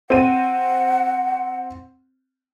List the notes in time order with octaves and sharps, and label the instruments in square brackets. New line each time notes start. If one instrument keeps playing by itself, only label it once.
[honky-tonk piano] C4 D#7 [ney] F#5